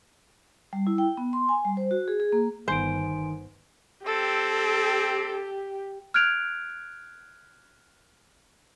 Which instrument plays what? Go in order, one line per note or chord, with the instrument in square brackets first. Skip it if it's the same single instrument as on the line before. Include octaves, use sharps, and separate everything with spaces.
[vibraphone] G3
E4
G5
B3
C6
G#5
G3
C5
F#4
G#4
G#4
A#3
[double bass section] G1 B3 [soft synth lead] D#3 [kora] C5 [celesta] G#5 C6 D7
[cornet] C4 [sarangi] G4 [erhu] A4
[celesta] F6 F#6 G#6 D7 F7